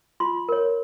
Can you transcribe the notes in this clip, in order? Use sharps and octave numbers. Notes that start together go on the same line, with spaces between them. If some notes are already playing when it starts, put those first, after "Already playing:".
F4 C6
A#4 C#5